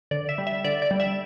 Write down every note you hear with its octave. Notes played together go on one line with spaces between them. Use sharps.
D3 D5
E5
G3
E5
D3 D5
D5
G3
E5